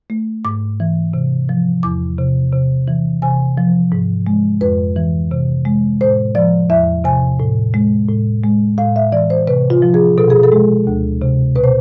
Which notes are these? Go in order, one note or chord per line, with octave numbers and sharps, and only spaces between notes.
A3
G#2 D6
E3
C3
F3
E2 D6
C3
C3
E3
C3 G#5
F3
G#2
G#3
F2 B4
E3
C3
G#3
A2 C5
F3 D5
E2 E5
C3 G#5
A2
G#3
A2
G#3
A2 F5
E5
E3 D5
C5
C3 B4
F4
F3
G#4
B2 A4
G#4
A4
G#3
D2
C3
B2 B4
C5